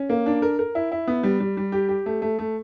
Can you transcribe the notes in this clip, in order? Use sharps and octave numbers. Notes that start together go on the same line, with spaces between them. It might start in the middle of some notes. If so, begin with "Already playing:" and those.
Already playing: C#4
A#3
D4
A#4
A#4
E4
E4
B3
G3
G3
G3
G4
G4
A3
A3
A3